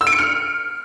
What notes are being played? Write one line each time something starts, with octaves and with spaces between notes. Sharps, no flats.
E6
D7
C#7
F6